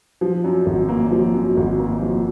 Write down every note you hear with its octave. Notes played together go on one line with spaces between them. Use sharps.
F3
F#2
G#1
A#3
F3
F#2
G#1
A#3
F3